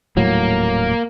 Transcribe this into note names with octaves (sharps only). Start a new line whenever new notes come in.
D#1 A2 F#3 A#3